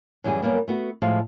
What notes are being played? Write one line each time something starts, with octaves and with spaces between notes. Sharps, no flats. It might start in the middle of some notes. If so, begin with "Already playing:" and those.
F#2 E3 G3 F#4 G#4
F#2 G3 A#3 B3
A3 B3 F#4
A2 F3 G#3 A4 F5